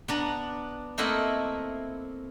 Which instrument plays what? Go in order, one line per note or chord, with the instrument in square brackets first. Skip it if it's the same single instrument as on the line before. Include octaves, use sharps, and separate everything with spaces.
[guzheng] B3 D4 A#5
A3 A#3 C4 E4 D#5 F#5